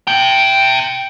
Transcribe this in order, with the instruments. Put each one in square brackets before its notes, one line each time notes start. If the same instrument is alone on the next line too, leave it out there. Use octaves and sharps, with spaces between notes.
[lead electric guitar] E5 G5